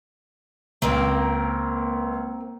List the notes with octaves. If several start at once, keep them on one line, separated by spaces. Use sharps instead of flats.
C#2 A#3 C4 A#4